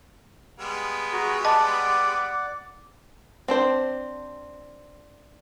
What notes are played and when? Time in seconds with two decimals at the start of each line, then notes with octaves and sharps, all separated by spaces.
0.59 G3 G#3 B3
1.13 F#4 G#4 A#5
1.45 D5 D#5 F#5 A5 D6
3.48 C4 D4 C5